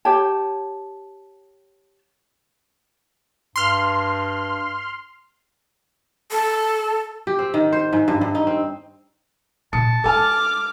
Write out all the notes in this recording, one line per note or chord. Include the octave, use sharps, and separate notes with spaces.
G4 C#5 G5 A5
G2 C6 F6
A4
G4
C4
D#3
C5
G#2
G2
G2
D#4
C4
A#2 A5 D#6 C#7
G#3 A4 G#5 D6 F6